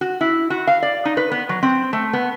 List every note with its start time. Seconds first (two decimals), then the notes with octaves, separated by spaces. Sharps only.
0.01 F#4
0.21 E4
0.50 F#4
0.67 F5
0.82 D5
1.05 D#4
1.17 B4
1.32 B3
1.49 F#3
1.63 C4
1.93 A3
2.13 B3